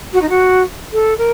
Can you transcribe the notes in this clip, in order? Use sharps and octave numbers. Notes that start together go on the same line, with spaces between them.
F#4
D#4
F#4
A4
A#4